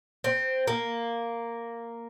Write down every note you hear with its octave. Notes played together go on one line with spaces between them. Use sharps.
C4
A#3